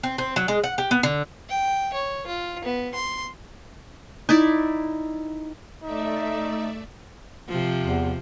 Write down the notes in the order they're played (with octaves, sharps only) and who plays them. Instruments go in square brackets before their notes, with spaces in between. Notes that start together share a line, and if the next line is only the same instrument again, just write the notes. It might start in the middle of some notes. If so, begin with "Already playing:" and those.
[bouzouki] C4
C4
F#3
G#3
F#5
G4
B3
D3
[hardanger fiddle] G5
C#5
F4
B3
C6
[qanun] D#4 E4 D5
[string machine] A3 D5 E5 [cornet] D#4
[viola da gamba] C3 F3
[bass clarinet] E2